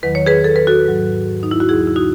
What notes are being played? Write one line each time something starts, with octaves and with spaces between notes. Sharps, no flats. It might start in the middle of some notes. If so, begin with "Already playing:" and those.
E2 D#3 F#3 B4
C#5
G#4 B4
A4
B4
F#4 A4
G#2 F#3
D#4
E4
F#4
E2 C#3 F#3 E4 G#4
E4
D#4 F#4